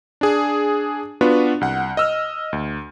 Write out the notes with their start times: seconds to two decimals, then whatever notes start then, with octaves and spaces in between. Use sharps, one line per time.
0.21 D4 G#4
1.21 B3 D4 F4 F#4 B4
1.61 C2 F#5
1.97 D#5 E6 F6
2.53 D2